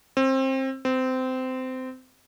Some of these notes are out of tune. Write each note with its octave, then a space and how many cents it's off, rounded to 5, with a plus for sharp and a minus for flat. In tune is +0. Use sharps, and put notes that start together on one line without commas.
C4 +25
C4 -20